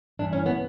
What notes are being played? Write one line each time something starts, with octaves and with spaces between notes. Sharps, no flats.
G2 E3 D4
C#4
B3